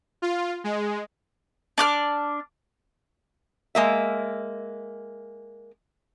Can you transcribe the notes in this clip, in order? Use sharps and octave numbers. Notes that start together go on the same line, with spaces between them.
F4
G#3
D4 D6 F6
G#3 A#3 E5